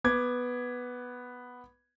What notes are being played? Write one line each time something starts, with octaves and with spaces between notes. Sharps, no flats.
B3 D6 G#6